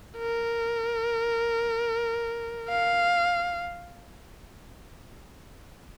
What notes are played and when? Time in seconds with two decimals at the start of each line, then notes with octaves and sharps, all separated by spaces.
0.18 A#4
2.69 F5